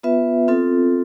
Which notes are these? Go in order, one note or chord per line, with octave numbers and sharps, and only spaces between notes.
B3 F4 B4 E5
C4 F4 A4